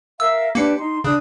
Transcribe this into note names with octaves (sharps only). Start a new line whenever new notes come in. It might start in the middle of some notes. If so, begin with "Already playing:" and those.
A#4 E5 F5 E6
A#3 D4 G4 B4 C#7
D#4 C6
C#3 D4 D#6 F#6